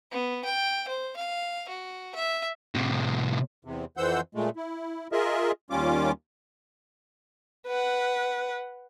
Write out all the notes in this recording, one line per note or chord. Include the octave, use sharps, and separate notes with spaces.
B3
G5
C5
F5
F#4
E5
A2 C3
E2 C3
F2 E3 C5 F#5 E6 G6
A#2 G#3 A3
E4
F4 G#4 A#4 D#5 E5
D#2 G3 C#4 F4 D6
B4 F#5